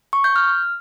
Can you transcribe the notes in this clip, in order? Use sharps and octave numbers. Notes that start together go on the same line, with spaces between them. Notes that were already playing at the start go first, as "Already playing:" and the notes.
C#6
G6
F6